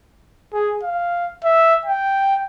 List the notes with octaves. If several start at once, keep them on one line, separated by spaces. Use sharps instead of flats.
G#4
F5
E5
G5